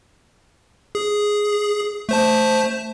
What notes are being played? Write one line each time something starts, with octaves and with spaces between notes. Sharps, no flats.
G#4
A3 C5 A5